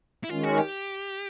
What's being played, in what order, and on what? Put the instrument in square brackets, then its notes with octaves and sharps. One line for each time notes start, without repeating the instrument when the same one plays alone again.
[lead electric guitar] E4
[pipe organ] D#3 G#3 C#4 [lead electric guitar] F4
[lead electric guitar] F#4
G4